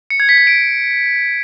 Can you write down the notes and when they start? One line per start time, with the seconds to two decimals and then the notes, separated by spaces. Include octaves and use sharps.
0.10 C#7
0.20 G#6
0.29 B6
0.38 G#6
0.47 D7